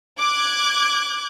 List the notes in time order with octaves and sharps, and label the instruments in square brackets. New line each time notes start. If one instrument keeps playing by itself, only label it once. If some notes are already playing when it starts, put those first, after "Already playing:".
[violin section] D6 F#6 G#6